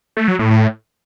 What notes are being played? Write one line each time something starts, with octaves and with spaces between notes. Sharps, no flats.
A3
F#3
A2
A2